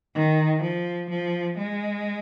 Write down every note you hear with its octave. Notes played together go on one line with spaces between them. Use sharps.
D#3
F3
F3
G#3